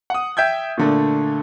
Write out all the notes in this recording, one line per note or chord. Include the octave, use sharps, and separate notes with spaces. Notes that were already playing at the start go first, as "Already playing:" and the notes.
F#5 D#6
E5 G5 G6 G#6
A#2 D3 A3